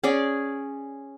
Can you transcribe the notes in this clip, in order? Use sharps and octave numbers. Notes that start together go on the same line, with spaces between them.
C#4 G#4 D5